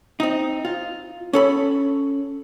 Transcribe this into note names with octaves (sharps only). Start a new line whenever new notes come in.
C4 D#4
F4
C#4 A4 B5